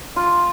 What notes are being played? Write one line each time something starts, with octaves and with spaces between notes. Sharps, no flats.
F4